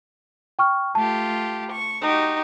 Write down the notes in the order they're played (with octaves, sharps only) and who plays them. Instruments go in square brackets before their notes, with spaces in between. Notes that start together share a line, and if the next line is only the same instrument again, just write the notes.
[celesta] G5 C#6 F6
[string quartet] A3 F4 G4 [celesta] A5
[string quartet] C#6
D#4 F#4 G4